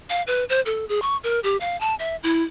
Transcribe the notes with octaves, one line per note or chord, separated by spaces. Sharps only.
F5
B4
C5
A4
G#4
C#6
A#4
G4
F5
A5
E5
E4